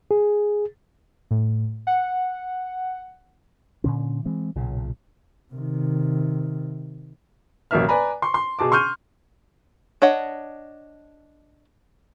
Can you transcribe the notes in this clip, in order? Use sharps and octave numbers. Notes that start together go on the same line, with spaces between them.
G#4
A2
F#5
A#2 D3 C#4
E3 G#3 C4
B1 A#2 C#3
C3 D#3
A1 F#2 B2 A#3 E5 F6
B4 D5 G#5 A#5 B5
C6 C#6
C6
B2 G#4 A5 D6
C6 C#6 F6 G6 D#7
D4 C#5 D#5 F#5